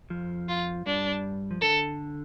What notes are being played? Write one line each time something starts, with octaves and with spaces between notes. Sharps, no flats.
F2 F3
F4
G2 G3 D4
F3
D3 A4